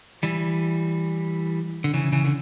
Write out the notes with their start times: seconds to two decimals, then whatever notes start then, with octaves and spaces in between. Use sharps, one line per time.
0.23 E3 G3
1.84 D3
1.94 C#3 E3
2.12 C#3 E3
2.25 D3